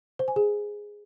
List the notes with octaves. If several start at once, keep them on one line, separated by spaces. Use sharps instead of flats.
C5
G#5
G#4